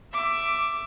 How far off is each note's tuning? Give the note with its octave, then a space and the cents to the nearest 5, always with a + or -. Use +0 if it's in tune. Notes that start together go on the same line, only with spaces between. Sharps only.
E5 +15 D6 +0